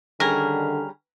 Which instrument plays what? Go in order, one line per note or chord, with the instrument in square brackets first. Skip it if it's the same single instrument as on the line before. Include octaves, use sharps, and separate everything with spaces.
[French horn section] D3 D#3 [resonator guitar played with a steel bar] G3 C#4 G#4 [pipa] A#4